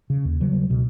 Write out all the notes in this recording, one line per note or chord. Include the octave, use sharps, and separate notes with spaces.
C#3
D#2
C#3 F#3 G3
C#2 B2